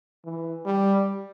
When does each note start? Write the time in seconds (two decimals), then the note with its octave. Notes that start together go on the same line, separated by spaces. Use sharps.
0.25 E3
0.65 G3